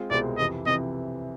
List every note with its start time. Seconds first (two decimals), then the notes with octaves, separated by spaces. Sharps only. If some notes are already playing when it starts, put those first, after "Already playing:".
Already playing: G#3 C4 F4
0.10 C2 B2 G#3 C4 F4 D5
0.38 F2 C3 E3 D#5
0.66 F2 C3 E3 D#5